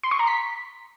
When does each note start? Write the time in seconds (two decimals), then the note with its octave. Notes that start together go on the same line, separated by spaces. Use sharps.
0.03 C6
0.11 C#6
0.19 A#5
0.27 B6